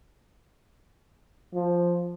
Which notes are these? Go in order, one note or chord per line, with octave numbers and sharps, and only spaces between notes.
F3